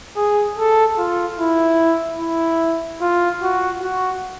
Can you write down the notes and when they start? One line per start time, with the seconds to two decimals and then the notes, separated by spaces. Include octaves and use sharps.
0.16 G#4
0.56 A4
0.98 F4
1.39 E4
2.19 E4
3.01 F4
3.42 F#4
3.82 F#4